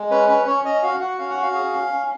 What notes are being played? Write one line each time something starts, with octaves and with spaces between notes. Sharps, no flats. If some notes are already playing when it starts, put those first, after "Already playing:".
Already playing: G#3
C#4 B4
C#4 B4
C#4 C#5
C#4 D#5
F#4 F5
F#4 F#5
C#4 F5
F#5
F#4
F5
G#4
C#4
C#4